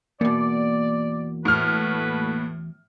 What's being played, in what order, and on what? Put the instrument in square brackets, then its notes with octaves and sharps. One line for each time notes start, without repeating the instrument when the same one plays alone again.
[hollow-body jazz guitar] E2 B2 [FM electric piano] A#3 [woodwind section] D5
[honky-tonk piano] A2 F6 [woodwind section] F#4 A4 B4